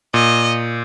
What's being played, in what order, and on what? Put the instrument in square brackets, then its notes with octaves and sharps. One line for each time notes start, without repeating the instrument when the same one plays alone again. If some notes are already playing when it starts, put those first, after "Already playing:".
[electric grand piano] A#2 [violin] D#5